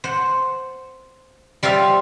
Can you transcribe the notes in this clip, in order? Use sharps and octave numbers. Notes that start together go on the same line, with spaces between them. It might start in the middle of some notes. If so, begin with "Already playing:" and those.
C5 F#5
G3 F4 C5 E5 F5